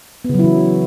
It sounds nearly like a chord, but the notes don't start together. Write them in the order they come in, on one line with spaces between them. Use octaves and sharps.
B3 C#3 F#3 E4 E3